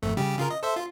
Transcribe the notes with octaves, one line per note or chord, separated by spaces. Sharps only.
G#1 F2 A3
C#3 G3 G4
C#3 F4 A#4
D#5
A4 C5 E5
F4